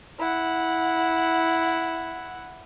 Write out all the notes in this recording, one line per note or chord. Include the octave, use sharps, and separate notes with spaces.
E4 F#5